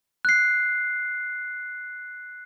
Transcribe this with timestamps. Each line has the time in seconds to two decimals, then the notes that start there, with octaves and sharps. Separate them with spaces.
0.25 F#6 C7